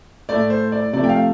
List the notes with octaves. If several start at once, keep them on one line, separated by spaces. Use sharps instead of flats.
A2 A3 D5
C5
D5
C3 F3 A3 D5
G5
F5